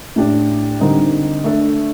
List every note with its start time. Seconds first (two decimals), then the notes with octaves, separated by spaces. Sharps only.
0.16 A2 A3 D4 G4 D5
0.80 D3 G3 C4 D#4 A#4
1.44 A3 D4 A4